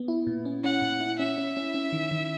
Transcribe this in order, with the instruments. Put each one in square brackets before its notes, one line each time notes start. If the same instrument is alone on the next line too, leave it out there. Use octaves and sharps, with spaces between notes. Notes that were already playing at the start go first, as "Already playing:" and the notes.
Already playing: [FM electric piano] B3
E4
A#2
C#4
[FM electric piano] C#4 [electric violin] F#5
[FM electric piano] A#2
E4
[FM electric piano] C#4 [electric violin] E5
[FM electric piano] C#4
C#4
C#4
D#3
D#3